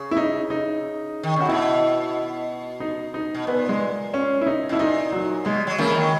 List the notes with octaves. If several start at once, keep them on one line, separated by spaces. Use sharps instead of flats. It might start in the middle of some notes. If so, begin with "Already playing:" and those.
Already playing: C#3
E4
D#4
D#4
D#3
C#3 F#4
B2 E4
D#4
D#4
B2
A#2 B3
G#3
C#4
E4
D#4
B2 E4
A#2 D#4
F#3
B2 G#3
F#3
C#3 E3 A#3
D#3 F#3